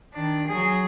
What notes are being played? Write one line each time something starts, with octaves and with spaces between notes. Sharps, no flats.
D#3 D4
F#3 G#4